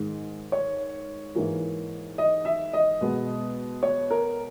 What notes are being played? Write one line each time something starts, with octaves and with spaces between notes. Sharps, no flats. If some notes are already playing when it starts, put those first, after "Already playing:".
Already playing: G#2 D#3 G#3
C#5
G#2 E3 A#3
D#5
E5
D#5
B2 G#3 B3
C#5
A#4